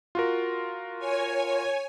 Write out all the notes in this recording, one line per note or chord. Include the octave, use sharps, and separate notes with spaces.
F4 F#4 A#4
C#5 G#5